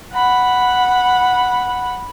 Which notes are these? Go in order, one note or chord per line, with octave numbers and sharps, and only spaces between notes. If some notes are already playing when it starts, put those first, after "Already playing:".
F#5 B5